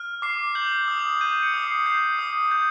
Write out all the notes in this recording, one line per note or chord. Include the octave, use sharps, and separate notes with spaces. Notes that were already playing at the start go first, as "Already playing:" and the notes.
Already playing: F6
D6 C7
G6 F#7
F#7
D#6
F7
G6 D#7
C#7
D#6
C7
G6 C7
D#6
G6